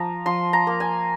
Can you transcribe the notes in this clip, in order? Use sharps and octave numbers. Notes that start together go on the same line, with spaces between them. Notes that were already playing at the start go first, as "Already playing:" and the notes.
Already playing: F3 A#5
F3 C6
A#5
A#3
G#5